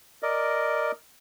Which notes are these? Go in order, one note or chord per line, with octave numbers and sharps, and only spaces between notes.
A#4 D5 D#5